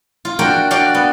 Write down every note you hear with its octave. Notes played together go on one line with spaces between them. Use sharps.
F4
D4 F#4 A#4 G5
D4 F#4 D5 F5 G5
B3